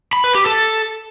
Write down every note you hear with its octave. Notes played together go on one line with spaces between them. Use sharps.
B5
B4
G4
A4